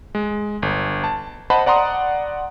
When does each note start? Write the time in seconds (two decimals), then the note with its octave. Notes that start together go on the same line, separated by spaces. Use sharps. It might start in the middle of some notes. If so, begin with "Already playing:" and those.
0.15 G#3
0.62 G1
1.04 A5
1.50 C5 D#5 F#5 A5 B5
1.66 D5 F#5 A#5 C6 D#6